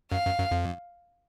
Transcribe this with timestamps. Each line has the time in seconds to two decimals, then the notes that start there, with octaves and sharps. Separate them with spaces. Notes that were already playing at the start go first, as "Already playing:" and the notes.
0.12 F#2 F5
0.25 F#2
0.39 F#2
0.51 F2